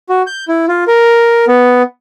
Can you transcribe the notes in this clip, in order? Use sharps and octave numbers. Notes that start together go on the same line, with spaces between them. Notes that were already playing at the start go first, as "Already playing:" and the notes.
F#4
G6
E4
F4
A#4
B3